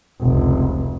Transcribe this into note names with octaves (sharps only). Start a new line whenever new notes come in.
F1 C#2